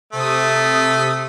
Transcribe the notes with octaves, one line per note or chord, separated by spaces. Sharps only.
C3 A3 D#6